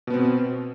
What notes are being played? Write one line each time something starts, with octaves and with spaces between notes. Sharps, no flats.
B2 B3 C4